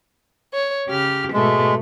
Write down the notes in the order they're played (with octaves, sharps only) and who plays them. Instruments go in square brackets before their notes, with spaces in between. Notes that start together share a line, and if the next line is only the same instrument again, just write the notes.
[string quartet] C#5
C#3 G4 F6
[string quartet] G#2 B2 A3 [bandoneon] G#3